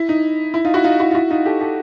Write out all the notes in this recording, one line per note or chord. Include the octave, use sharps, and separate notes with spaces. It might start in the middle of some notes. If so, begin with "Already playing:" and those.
Already playing: E4
D#4
E4
D#4 F4
E4 F#4
D#4 F4
E4 F#4
F4
E4 F#4
D#4 F4
G4 A4
G4 A4